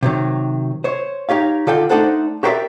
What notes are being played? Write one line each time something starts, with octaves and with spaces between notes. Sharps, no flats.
C3 D#3 F#3
C5 C#5
D#4 G4 C#5 F5
D3 F4 A4 D5 G5
A3 D4 D#4 A4 C5 F#5
F#4 G4 A#4 C5 D5 E5